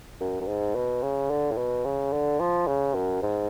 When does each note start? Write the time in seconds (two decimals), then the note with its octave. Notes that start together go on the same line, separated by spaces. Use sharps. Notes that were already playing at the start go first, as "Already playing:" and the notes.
0.20 F#2
0.41 F#2
0.47 G#2
0.75 B2
1.02 C#3
1.30 D3
1.51 A2
1.57 B2
1.85 C#3
2.13 D3
2.40 F3
2.67 C#3
2.94 F#2
3.22 G#2